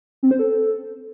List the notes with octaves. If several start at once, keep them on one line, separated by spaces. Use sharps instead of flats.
C4
C5
A4